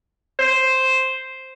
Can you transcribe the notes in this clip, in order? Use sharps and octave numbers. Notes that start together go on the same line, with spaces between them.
C5